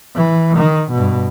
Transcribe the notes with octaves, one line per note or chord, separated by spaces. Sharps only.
E3
D#3
G2 B2